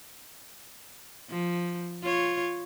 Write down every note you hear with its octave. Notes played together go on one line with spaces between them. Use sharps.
F3
F4 C#5